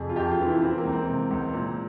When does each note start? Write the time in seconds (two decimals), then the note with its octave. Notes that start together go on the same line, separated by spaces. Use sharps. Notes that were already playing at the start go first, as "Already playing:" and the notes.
Already playing: F2 C3 G#4
0.09 F4
0.16 F2 G4
0.31 F4
0.40 E3
0.47 E4
0.62 E3 C4
0.78 A#3
0.85 C#2
0.92 C4
1.09 C3
1.31 C#2
1.54 A#2